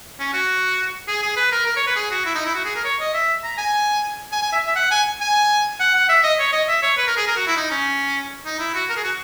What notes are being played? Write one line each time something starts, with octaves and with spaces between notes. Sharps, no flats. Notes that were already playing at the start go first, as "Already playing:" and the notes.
C#4
F#4
G#4
G#4
B4
A#4
A#4
C#5
B4
G#4
F#4
E4
D#4
E4
F#4
G#4
A#4
C#5
D#5
E5
A#5
G#5
G#5
G#5
E5
E5
F#5
G#5
G#5
F#5
F#5
E5
D#5
C#5
D#5
E5
C#5
B4
A#4
G#4
A#4
F#4
E4
D#4
C#4
D#4
E4
F#4
A#4
G#4
F#4